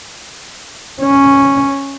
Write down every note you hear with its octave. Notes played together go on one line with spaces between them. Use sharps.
C#4